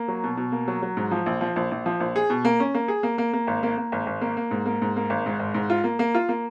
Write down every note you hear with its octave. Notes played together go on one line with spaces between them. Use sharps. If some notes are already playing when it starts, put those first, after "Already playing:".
Already playing: A#3
F#3
B2
B2
A#3
F#3
F#3
G#2
F3
A#1
F3
A#1
A#1
F3
A#1
G#4
B2
A#3
C#4
A#3
G#4
A#3
A#3
A#3
G#1
A#3
A#3
G#1
G#1
A#3
A#3
G#2
A#3
G#2
A#3
G#1
G#2
G#1
G#2
F4
A#3
A#3
F4
A#3